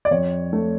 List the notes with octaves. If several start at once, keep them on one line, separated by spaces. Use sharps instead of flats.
D5
F2 C#5
A3